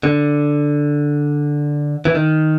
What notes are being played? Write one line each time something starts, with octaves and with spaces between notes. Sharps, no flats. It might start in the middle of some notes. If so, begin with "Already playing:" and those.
D3
E3
D#3